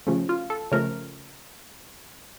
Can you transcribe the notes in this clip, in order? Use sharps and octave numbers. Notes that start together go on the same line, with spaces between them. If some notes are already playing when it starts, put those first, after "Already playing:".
C#3 F3 A3
F4
A4
C#3 F3 A3 A#4